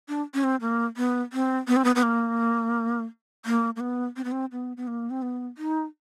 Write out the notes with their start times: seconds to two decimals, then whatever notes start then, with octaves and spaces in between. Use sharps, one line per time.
0.09 D4
0.34 C#4
0.44 C4
0.61 A#3
0.97 B3
1.33 C4
1.68 B3
1.76 C4
1.85 B3
1.95 B3
2.03 A#3
3.45 A#3
3.76 A#3
3.80 B3
4.16 C4
4.24 B3
4.32 C4
4.52 B3
4.77 B3
4.87 A#3
5.10 C4
5.22 B3
5.58 D#4